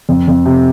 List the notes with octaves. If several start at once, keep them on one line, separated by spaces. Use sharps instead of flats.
F2
F2
C3